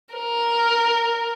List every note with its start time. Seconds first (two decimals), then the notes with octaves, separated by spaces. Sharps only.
0.15 A#4